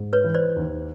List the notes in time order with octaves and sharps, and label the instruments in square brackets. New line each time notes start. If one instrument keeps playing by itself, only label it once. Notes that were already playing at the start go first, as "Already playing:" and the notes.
Already playing: [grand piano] G#2
[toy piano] B4 C#5
[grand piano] E3
[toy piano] C5 D5
[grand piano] D#2